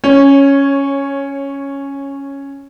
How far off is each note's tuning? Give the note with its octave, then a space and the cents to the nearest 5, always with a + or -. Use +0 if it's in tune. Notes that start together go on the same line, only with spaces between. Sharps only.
C#4 +0 C#5 -15